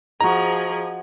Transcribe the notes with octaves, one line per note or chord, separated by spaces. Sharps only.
F3 F#4 G#4 D#5 A#5